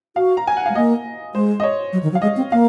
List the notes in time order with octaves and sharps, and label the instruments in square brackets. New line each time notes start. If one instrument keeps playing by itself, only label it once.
[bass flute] F#4 [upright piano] F5
[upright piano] A#5
G#5
F#5
[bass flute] G#3 [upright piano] F5
[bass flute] A#3 [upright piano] D#5
[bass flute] G#3 [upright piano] C5
[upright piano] D#5
C#5
[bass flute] F#3
D#3
F#3
[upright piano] F5
[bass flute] G#3 [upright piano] D#5
[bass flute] C4
[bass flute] A#3 [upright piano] F5